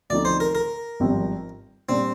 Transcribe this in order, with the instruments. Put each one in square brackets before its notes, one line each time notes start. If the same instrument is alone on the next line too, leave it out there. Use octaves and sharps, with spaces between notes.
[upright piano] D2 D3 F3 C4 D#4 [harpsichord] D5
[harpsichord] C5
A#4
A#4
[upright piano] G#1 G2 F3 C4 G4
[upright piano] A#2 G3 D4 [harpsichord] C4